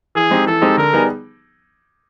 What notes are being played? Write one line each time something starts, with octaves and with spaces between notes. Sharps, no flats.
E3 G#4
G#3 C4 D#4 G4
E3 A4
G#3 C4 D#4 G4
D3 A#4
G3 B3 D#4 G#4